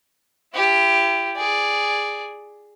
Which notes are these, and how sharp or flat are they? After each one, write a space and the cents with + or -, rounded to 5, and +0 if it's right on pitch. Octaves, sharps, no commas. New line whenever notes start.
E4 +40 G4 +5
G#4 +0 D5 +0